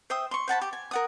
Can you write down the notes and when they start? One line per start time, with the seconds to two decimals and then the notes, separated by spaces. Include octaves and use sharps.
0.10 C5 E5 G5 D#6
0.31 C6 C#6
0.48 C5 F#5 A5 B5
0.61 G4
0.73 G#5
0.91 A#4 F#5 D#6